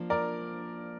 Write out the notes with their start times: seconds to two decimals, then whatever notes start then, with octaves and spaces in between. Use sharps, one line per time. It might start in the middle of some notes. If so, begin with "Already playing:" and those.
Already playing: F3 A#3 D4
0.10 A#4 D5